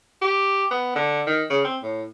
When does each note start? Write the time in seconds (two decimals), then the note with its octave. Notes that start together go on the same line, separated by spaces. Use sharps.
0.22 G4
0.71 B3
0.96 D3
1.27 D#3
1.50 C#3
1.65 C4
1.83 A2